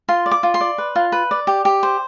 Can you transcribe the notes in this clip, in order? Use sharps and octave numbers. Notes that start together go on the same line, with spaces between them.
F4 C6
D5
D6
F4
C6
D5
B4
F4
B4
D5
G4
G4
C5